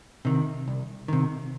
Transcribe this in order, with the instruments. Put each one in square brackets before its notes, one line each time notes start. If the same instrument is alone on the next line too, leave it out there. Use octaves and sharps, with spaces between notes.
[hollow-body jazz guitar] C3 D#3
C2
C3 D#3